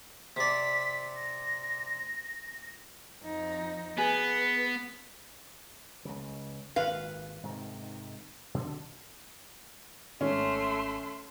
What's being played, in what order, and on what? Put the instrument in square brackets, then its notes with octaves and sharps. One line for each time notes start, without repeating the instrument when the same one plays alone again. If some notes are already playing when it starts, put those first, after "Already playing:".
[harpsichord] C3 D5 [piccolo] B6
[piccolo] A#6
[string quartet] F2 D#4
[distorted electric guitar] B3 [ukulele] G#4 [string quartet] B4
[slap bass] C#2 C#3
[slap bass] G#1 A#2 [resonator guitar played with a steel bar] B4 F5
[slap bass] G#2 C3 D#3
B2 D3 D4
[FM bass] G#1 [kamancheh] A3 C6 [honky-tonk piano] C#4